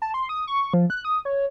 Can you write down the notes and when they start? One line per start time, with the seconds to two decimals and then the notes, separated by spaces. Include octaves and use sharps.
0.02 A5
0.14 C6
0.29 D#6
0.47 C#6
0.74 F3
0.90 F#6
1.05 D#6
1.25 C#5